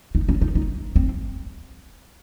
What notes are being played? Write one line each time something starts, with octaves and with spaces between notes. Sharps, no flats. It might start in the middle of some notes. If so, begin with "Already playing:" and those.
D#4
C#4
D#4
D#4
C4